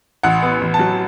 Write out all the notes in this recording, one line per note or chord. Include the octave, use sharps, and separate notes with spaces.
A1 F#5
B3
A1
A5
F#3